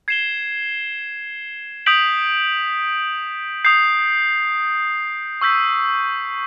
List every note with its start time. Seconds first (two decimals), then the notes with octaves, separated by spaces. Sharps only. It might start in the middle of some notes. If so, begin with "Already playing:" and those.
0.08 G#6 C7 E7 G7
1.86 D#6 G6 B6 D7 F#7
3.65 D#6 G6 C7
5.41 C#6 E6 G6 B6